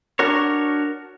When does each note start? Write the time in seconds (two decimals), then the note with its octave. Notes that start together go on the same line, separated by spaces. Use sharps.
0.19 D4 F#4 A#4 C#5